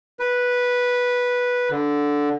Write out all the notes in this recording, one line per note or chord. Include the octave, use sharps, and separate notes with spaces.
B4
D3